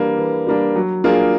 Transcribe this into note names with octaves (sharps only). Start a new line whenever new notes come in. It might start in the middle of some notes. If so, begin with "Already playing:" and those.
Already playing: E3 G3 A#3 D4
E3
G3 A#3 D4
F#3
A#3 D4 F4 G#4